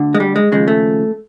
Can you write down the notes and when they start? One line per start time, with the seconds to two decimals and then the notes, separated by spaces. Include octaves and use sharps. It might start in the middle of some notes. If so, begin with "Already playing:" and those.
Already playing: D2 D3
0.15 G#3
0.20 G3
0.36 G#3
0.51 D#2 C#3 F3 G#3
0.68 A3